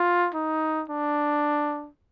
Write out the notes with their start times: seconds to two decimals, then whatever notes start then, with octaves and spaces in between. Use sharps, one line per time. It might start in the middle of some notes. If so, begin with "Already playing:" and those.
Already playing: F4
0.34 D#4
0.90 D4